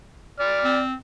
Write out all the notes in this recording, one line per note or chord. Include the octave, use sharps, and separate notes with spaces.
D5 F6
C4